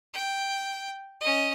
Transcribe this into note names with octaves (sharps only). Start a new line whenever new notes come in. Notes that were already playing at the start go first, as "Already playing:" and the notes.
G5
C#4 D#5